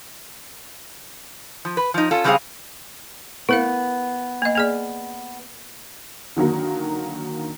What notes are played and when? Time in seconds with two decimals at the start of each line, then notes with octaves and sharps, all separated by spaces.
1.65 F3
1.77 B4
1.94 F3 D#4
2.11 C#4 F4 A4
2.24 C#3 G3 G#3 C4 G#4 F5
3.49 B3 E4 A#4 F5
4.42 A#3 D#5
4.55 A#3 G#4 D5
6.36 D3 D#3 F#3 A#3